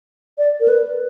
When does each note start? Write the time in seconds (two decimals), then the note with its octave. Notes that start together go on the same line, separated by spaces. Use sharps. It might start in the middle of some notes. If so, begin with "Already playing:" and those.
0.38 D5
0.60 A#4
0.68 B4